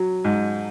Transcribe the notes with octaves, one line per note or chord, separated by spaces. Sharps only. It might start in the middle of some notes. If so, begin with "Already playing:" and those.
Already playing: F#3
G#2